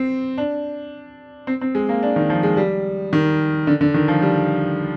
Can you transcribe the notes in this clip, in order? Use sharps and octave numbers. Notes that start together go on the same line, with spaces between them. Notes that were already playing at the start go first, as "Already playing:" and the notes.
Already playing: C4
D4
C4
C4
G#3
A#3
D4
D#3
F3
G#3
G3
D#3
D3
D3
D#3
F3
G3